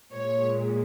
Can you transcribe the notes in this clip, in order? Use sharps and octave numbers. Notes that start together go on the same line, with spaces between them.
A#2 G#3 C#5